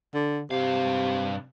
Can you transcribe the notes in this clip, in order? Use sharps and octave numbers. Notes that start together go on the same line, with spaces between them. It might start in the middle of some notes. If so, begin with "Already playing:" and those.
D3
G2 C3 F5